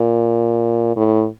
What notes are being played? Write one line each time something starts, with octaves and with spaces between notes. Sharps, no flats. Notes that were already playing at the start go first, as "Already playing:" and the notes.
Already playing: A#2
A2